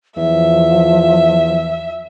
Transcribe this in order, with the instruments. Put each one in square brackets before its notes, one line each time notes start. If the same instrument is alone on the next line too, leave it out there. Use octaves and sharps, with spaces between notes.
[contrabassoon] E2 [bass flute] F3 [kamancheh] E5